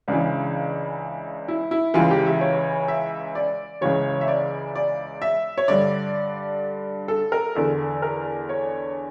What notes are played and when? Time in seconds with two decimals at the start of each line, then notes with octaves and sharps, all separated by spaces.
0.08 C#2 C#3 E3 D4
1.48 E4
1.71 E4
1.94 C#2 C#3 E3 F4
2.10 G4
2.26 E5
2.41 C#5
2.88 E5
3.35 D5
3.81 C#2 C#3 E3 C#5
4.21 E5
4.28 D5
4.75 D5
5.22 E5
5.58 C#5
5.68 G2 D3 D5
7.08 A4
7.32 A#4
7.55 E2 D3 A4
8.02 A#4
8.49 C#5